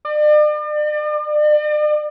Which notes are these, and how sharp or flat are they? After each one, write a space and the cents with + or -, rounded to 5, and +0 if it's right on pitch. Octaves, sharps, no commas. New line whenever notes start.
D5 +40